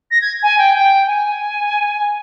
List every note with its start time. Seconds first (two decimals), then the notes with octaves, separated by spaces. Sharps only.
0.11 A#6
0.21 G#6
0.42 G#5
0.58 G5
0.74 G5
1.06 G#5